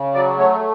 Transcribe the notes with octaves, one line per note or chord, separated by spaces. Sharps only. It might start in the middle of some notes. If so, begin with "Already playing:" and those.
Already playing: C#3
F#3 D5
A3 C#5